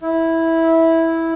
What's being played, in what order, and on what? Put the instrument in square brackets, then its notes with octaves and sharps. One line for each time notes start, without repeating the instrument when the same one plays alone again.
[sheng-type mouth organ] E4